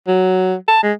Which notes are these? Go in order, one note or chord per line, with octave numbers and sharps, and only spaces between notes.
F#3
A5
G#3